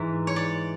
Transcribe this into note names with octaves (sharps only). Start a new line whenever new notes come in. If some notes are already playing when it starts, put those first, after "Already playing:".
Already playing: G#2 E3 E5
C#5
D5